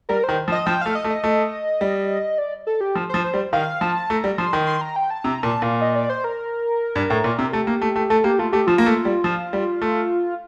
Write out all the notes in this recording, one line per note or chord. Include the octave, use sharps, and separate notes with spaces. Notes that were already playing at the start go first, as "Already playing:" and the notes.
G3 A#4
D#3 C5
F3
D#5
F3 G5
A3 F5
D#5
A3
D#5
A3
G3
D5
A4
G4
F3
F3 C5
C5
G3
D#3 F5
F3 A5
A3 A#5
G3
F3 C6
D#3
C6
A#5
G5
A5
C3 A#5
A#2 A5
A#2 F5
D#5
D5
C5
A#4
G2
A2
A#2
C3
A3 G4
A#3
A3
A3
A3 A4
A#3 G4
A3 F4
A3 G4
F3 F4
A#3
A3
G3
F3
G3
A3